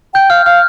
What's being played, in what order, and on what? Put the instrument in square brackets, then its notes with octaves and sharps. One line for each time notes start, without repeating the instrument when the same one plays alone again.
[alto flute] G5 [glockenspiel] G6
[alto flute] F5 [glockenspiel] F6
[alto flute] F5 [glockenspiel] F6